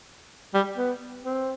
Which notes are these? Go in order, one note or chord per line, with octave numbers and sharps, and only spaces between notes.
G3
B3
C4